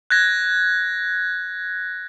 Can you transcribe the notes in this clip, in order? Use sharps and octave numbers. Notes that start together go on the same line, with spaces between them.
F#6 G#6 A#6